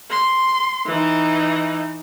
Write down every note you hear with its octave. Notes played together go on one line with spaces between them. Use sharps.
C6
E3 D#4